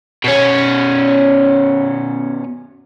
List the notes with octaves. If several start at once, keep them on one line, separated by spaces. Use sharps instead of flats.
B2 C#4